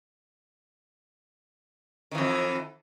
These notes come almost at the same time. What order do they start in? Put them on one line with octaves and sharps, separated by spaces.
D#3 E3 F2